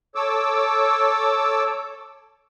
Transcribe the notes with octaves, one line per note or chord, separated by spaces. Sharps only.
A4 C#5 D6 E6